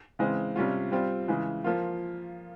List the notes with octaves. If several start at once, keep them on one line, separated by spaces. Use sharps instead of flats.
C#3 E3 G#3 C4
C3 G3 C#4 F4
G3 C4 F4
C#3 E3 G#3
F3 A#3 F4